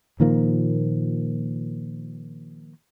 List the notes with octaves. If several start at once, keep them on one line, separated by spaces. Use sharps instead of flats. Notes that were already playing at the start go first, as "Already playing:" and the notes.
A#2 D#3 F3 A#3